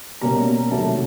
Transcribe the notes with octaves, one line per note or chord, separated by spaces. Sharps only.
B2 G3 A#3 C#4 A#5
C3 D#3 F#3 A3 A5